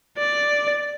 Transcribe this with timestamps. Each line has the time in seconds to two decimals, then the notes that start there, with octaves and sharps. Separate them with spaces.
0.18 D5